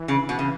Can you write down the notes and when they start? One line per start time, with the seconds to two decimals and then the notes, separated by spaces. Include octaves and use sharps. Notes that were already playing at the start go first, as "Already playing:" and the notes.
Already playing: E3
0.08 C#3
0.29 B2
0.39 C#3